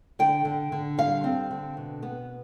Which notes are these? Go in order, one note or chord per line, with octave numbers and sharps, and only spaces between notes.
D3 G5
D3
D3
G3 F5
C4
D3
B2
B3